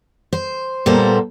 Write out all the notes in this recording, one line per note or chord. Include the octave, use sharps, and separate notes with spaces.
C5
A#2 G3 A#3 B3 A4 C5